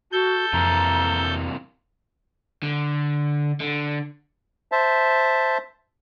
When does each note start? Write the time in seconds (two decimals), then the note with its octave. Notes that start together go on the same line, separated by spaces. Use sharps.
0.12 F#4 A4 G6
0.53 F2 C3 E3 A#3 A#5
2.63 D3
3.61 D3
4.72 C5 E5 A5